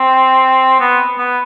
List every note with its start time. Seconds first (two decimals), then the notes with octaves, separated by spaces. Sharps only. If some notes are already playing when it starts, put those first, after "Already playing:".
Already playing: C4
0.80 B3
1.18 B3